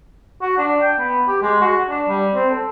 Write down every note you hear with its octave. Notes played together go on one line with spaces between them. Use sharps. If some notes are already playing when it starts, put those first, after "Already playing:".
F#4
D4
G5
B3
G4
G#3
F#4
D4
G3
C4
A4